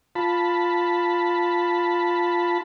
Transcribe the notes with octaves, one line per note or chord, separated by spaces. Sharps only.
F4 A5 B5